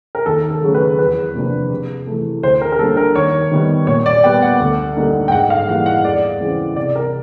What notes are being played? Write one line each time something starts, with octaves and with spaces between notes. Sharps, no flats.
A#4
D#2 A4
A4
C#3 F#3 A3
B4
E2 B4
C3 F3 A#3 D4
C3
E3 A3
D2 C5
A#4
A#4
D3 G3 A#3 D4 A4
A#4
D#2 C#5
D#3 G3 B3
A#2 C#5
D5
G3 B3 G5
F#5
D2
D3 G3 A#3 D#4
G5
G#2 F#5
F5
E3 G3 A#3 F#5
F#5
E2 D5
C#3 E3 G#3 C4
C3 D5
A#4